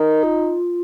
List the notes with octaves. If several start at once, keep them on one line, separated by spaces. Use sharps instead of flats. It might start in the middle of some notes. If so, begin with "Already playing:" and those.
Already playing: D#4 A#4
F4